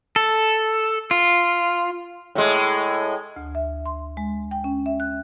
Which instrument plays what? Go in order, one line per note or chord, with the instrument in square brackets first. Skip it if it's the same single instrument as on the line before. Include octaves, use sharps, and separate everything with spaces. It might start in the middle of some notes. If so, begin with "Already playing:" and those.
[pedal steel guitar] A4
F4
[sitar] A2 G#3
[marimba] D2
E5
C6
G#3
G5
C#4
E5
F#6